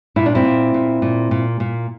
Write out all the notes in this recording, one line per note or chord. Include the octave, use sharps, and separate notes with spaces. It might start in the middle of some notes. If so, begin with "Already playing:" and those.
A#2 E4
D4
C4 E4
A#2
A#2
A#2
A#2
A#2